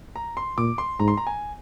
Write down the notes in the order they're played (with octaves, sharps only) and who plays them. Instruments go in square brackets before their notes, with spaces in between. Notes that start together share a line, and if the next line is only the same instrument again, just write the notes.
[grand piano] A#5
C6
[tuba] A#2 [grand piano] D6
[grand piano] C6
[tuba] G#2 [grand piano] A#5
[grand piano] C6
A#5
G#5